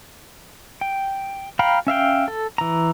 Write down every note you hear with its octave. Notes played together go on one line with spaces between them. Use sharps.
G5
F5 G5 A#5 B5
C#4 E5 F5 G5
A4
E3 A#5